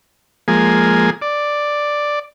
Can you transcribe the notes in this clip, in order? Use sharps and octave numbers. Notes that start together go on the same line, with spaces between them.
F3 G#3 A#3 G#4
D5